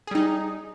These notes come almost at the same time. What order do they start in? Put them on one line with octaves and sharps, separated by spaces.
G#4 G3 D#4